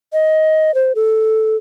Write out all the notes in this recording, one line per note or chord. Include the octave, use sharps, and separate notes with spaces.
D#5
C5
A4